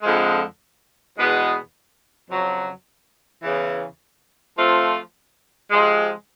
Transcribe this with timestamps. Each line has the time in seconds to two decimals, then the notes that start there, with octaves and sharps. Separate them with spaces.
0.03 F2 D3 F3 G#3
1.16 E2 B2 G#3 B3
2.29 F2 C#3 F#3
3.43 E2 C#3 E3
4.57 F3 A3 C4 F4
5.71 C3 F3 G#3